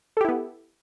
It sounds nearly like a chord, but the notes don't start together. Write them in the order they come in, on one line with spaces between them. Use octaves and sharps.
A4 G4 E4 B3